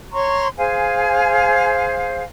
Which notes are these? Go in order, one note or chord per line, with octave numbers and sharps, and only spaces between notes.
C#5 A#5 C6 C#6
G#4 C5 F5 G#5